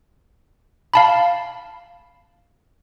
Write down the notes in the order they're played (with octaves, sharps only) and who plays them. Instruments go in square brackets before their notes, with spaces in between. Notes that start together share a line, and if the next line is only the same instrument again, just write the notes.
[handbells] F5 A5 B5